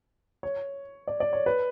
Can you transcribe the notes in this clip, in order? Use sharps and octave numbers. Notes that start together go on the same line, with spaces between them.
C#5
D5
D5
C#5
B4